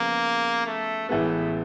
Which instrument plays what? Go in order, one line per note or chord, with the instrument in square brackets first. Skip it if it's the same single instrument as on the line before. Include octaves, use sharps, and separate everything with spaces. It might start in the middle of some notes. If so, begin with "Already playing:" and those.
Already playing: [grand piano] C#3 F3 G#3 B3 [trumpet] A#3
[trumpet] A3
[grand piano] A1 A2 E3 G#3 B3 [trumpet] A3